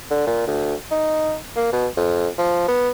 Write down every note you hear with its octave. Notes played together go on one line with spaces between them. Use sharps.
D3
A#2
D2
D#4
A#3
B2
F2
F3
B3